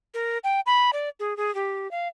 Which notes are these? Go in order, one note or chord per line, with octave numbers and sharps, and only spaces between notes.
A#4
G5
B5
D5
G#4
G#4
G4
F5